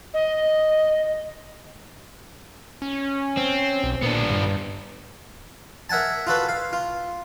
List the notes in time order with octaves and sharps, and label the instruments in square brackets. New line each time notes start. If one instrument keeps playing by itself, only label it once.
[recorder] D#5
[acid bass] C#4
[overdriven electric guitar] C4
[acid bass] B1
[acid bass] A#2 [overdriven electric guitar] B3 D4
[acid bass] G2
[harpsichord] A#4 E5 F#5 G#5 A5
F4 F#4 A4 B4
F5
F4